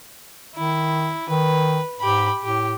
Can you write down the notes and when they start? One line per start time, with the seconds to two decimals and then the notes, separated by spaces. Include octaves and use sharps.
0.56 D#3 E4
1.29 D#3 B4
2.00 G#2 G4 B5
2.43 A2 G4